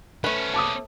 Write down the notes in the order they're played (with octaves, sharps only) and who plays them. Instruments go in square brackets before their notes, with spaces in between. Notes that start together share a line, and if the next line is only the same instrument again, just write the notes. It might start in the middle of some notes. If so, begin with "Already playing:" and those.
[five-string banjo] A3 B4 [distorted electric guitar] B3 C#4
[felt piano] A5 D6 D#6